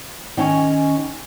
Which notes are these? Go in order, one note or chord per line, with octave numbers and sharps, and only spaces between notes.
D#3 C#4 G#5